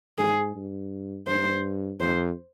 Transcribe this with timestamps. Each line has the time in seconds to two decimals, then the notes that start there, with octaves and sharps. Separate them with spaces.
0.18 G#2 G#4
0.56 G2
1.27 G2 C5
2.00 F2 C5